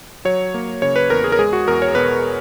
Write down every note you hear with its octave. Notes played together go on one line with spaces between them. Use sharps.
F#3 C#5
A#3
C#3 C#5
B4
E2 A#4
G#4
A#4
G#3 G#4
F#4
E2 A#4
C#5
B2 B4